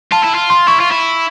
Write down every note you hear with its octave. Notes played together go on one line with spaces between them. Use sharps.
F4 A5
E4
F4
C6
E4 C#6
F4
E4